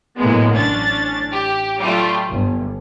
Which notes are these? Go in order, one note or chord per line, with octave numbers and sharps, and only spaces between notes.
A2 F#3 G#3 A#3 B3
A1 C#4 D4 A6
G4
F#3 G3 A3 F4
G1